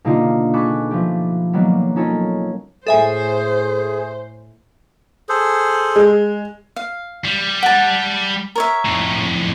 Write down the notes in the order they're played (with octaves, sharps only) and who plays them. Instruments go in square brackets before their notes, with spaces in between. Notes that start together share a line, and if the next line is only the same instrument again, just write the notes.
[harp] B2 D3 A#3 D#4 F4 G4
G#4 A4 B5 C#6 D6 F#6
F3 A3 G4
D#3 F#3 G3 A#3 B3
C#4 D#4 F4 A4 A#4 C#5
[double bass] A2 [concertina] G#4 [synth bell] A4 E5 G#5 [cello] C5
[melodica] G#4 A4 C5
[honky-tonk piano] G#3
[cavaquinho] F5
[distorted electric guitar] G3
[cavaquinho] F#5 A5
A#4 C#5 E5
[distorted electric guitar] F2 A2